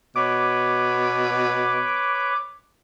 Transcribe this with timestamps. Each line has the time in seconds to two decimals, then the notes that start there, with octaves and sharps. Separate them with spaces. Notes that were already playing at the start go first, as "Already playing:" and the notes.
0.16 B2 B4 C#5 D6